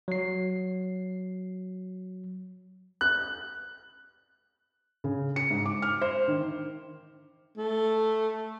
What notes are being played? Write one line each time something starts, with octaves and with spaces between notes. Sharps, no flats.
F#3 C7
F#6
C#3
C#7
G#2
D6
F6
C5
D#3
A3